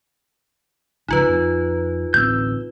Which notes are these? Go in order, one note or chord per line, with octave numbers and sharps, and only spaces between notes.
G#1 C#2 F3 D#4 F4 B4
F2
D1 A1 C4 E6 G6